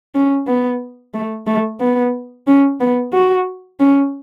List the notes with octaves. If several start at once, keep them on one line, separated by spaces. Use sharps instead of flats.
C#4
B3
A3
A3
B3
C#4
B3
F#4
C#4